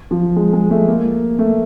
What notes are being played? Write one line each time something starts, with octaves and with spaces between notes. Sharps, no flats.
F3
G#3
G#3
A3
A#3
A3